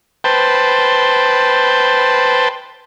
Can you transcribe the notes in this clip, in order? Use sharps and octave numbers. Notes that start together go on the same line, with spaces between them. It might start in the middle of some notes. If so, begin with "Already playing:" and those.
B4 C5 G5 A5